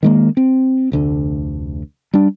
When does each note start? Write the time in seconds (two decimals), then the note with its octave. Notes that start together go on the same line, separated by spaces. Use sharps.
0.03 D#3 G#3 A#3
0.37 C4
0.92 F1 D2 D3
2.14 G3 D4